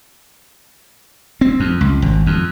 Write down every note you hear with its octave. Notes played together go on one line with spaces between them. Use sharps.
C4
F2
C#2
G#1
F2